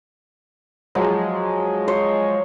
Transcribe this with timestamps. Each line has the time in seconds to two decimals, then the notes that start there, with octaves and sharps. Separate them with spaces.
0.95 F3 F#3 G#3
1.88 C5 C#5 C6